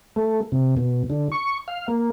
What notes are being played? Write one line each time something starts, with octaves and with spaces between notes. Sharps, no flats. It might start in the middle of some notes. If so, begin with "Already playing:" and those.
A3
C3
B2
D3
C#6
F5
A#3